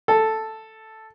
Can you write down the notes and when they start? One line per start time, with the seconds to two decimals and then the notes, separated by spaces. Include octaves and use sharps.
0.08 A4